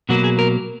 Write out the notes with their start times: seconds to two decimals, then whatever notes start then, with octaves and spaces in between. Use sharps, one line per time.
0.09 B2 F#3 A#3 F#4
0.24 G#4
0.39 A#4